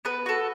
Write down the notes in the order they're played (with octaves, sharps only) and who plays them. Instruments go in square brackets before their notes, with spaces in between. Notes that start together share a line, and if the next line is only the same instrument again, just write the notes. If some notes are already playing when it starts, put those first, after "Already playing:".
[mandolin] B3 B4
F#4 A4